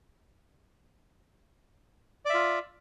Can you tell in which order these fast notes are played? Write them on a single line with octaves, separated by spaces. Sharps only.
D5 E5 F4